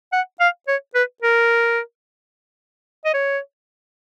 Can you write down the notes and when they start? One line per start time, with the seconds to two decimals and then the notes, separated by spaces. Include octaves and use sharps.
0.12 F#5
0.40 F5
0.68 C#5
0.95 B4
1.22 A#4
3.05 D#5
3.14 C#5